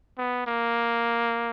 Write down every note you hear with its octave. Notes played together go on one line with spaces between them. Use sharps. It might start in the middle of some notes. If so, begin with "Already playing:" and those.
B3
A#3